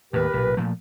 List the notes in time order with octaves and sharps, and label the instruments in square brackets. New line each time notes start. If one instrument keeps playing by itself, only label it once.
[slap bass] D#2 A2 [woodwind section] G4 A#4 B4
[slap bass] B1 A#2
A#2 F3 A3